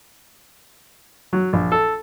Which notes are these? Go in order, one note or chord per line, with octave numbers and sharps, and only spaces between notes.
F#3
A#1
A4